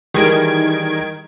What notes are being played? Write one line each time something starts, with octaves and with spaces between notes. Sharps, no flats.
D#3 E3 G3 G#4 G#6 D7